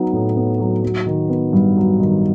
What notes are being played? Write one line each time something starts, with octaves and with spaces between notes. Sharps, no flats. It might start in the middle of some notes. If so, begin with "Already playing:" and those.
Already playing: F#3 B3 D#4
A2
B3
F#3
F#3
D#3
B3
G2
F#3
D#3